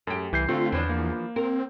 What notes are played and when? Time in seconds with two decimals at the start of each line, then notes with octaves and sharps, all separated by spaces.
0.07 F#2 A3 G4
0.33 C2 E3 G6 C7
0.49 D3 A3 C4 F4
0.72 E2 E3 F3 D4
0.90 A#3
1.36 C4 A#4